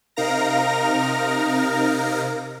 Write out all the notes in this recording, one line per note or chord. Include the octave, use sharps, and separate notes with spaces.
C3 D#4 A#4 F5 A#5 A#6